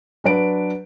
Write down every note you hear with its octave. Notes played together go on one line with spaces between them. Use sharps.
F#3 D4 B4 D7